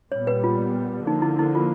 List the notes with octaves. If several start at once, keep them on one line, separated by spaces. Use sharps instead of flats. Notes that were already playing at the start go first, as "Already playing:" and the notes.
A#2 G3 B3 C#5
B4
F4
D3 F3 A#3 D#4
E4
E4
F4